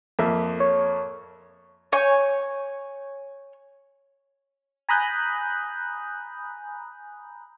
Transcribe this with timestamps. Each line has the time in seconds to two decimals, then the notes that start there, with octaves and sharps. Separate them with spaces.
0.19 F2 A#3 E5
0.60 C#5
1.92 C#5 G#5 G6
4.89 G#5 A#5 B5 D#6 F#6 G6